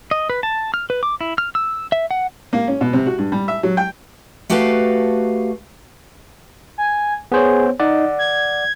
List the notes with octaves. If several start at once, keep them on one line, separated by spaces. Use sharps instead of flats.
D#5
B4
A5
F6
B4
D6
E4
F6
E6
E5
F#5
A#3
C#4
B2
C3
F#4
G2
G3
E5
F#3
G5
A3 F#4 G4 A4 B4 F5
G#5
B3 G#4 C5 C#5
D#4 D5 F#5
G#6